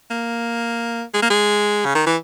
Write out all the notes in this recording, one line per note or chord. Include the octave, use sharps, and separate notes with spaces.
A#3
G#3
A#3
G#3
C#3
D#3
E3